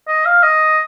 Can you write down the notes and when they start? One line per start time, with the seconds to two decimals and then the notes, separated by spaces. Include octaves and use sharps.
0.08 D#5
0.26 F5
0.43 D#5